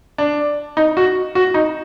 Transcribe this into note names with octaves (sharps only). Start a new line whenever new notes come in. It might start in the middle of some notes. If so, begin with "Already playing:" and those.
D4
D#4
F#4
F#4
D#4